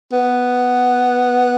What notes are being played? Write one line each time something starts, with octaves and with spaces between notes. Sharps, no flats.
B3